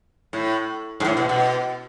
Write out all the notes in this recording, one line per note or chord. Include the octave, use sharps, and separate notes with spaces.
A2
G#2
A2
B2
B2